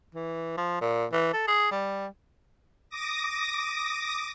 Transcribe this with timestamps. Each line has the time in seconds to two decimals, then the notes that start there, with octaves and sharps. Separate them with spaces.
0.15 E3
0.57 F3
0.81 A#2
1.12 E3
1.33 A4
1.48 G#4
1.71 G3
2.90 D6 D#6 A#6